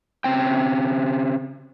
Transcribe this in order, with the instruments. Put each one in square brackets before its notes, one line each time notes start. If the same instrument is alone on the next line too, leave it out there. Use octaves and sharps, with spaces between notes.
[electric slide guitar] C#3 C4 G5